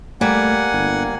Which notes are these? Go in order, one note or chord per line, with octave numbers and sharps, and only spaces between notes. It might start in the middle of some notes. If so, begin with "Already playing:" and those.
G3 A3 A#3 F#5 G#5
G1